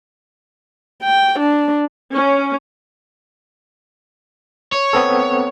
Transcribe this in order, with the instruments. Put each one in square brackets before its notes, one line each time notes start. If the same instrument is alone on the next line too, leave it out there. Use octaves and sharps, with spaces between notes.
[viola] G5
D4
[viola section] C#4
[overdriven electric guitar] C#5
[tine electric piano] B3 C4 A4